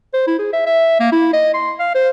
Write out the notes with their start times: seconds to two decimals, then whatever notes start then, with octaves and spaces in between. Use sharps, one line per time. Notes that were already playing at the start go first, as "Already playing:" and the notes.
0.14 C5
0.27 E4
0.39 G#4
0.53 E5
0.66 E5
1.00 A#3
1.12 E4
1.33 D#5
1.54 C6
1.79 F5
1.95 C5